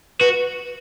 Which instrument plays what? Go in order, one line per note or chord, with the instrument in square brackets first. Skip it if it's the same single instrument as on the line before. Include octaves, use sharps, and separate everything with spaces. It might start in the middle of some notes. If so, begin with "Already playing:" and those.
[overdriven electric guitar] F#4 [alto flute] B4